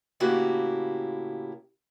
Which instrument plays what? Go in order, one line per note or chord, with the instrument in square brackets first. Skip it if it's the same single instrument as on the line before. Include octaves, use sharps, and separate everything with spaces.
[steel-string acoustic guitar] A2 C#3 A#3 E4 F#4 G4